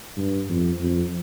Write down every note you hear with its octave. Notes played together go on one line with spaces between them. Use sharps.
G2
F2
F2